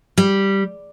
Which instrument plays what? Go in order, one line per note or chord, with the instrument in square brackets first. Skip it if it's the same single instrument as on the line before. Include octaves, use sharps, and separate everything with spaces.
[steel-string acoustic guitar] G3